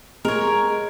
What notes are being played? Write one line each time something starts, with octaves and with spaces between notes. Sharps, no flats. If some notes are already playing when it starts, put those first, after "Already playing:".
G#3 A#4 C#5